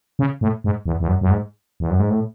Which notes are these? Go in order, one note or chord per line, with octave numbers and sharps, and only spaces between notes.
C#3
A2
G#2
E2
E2
F#2
F#2
G#2
E2
F#2
G#2
A2